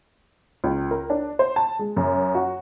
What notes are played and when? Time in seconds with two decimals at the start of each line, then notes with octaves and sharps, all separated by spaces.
0.64 C#2
0.91 A#4
1.10 D4
1.39 C5
1.56 A5
1.79 G#3
1.96 F#2
2.35 F#4